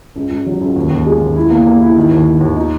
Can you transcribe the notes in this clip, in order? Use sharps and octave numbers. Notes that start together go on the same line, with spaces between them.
C#2
C#2
F#3
C#2
D#2
D#2
G#3
D#2
E4
A#3
A#3
E4
D#3
D#2
D#3
D#2
D#4